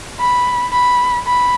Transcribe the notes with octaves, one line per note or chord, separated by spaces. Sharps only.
B5
B5
B5